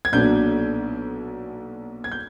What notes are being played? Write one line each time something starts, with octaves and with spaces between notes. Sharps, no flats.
G#6
B1 A#2 F#3 B3 D4 G6
G#6
G6